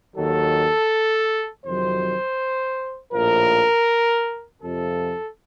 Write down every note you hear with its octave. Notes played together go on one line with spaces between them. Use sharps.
D#2 D#3 F#3 A4
F2 C3 D#3 F#3 C5
A#1 A2 F3 A#4
F2 C3 F3 A4